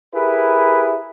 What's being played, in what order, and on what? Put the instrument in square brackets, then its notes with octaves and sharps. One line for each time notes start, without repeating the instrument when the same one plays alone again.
[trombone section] E4 G4 G#4 A#4 B4